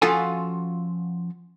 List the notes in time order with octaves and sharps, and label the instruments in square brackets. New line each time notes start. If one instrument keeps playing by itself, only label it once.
[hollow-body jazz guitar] F3 C#4 F4 F#4 A4 G#5